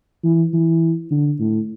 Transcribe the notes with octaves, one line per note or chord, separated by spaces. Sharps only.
E3
E3
D3
A2